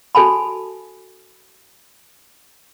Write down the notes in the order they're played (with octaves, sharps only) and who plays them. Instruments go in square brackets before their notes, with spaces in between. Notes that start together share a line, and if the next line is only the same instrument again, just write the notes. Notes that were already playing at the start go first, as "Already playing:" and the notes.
[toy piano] F#4 A4 G#5 A5 B5